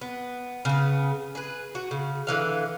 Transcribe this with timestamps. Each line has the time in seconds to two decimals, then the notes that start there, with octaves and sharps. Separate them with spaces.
0.01 B3
0.65 C#3 B3
1.35 G#4 B4
1.75 F#4
1.91 C#3
2.27 D3 E3 F5